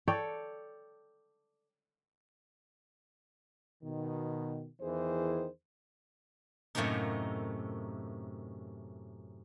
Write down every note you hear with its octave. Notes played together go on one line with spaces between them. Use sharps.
A4 C#5 D5 G5
B2 D#3
E2 D#3 E3 G#4 C5
F#2 A2 C3 A3 A#3 D#4